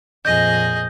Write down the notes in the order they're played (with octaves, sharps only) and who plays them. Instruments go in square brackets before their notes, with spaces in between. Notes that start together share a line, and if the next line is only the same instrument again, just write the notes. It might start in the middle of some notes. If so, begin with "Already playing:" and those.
[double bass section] F2 A#2 [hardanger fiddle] G#4 D#5 [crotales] G6 A#6